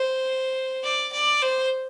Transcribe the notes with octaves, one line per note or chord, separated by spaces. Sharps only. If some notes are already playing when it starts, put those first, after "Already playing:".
Already playing: C5
D5
D5
C5